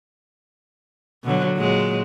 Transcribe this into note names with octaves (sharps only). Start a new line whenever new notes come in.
B2 D3 F#3
A#2 F#3 G#3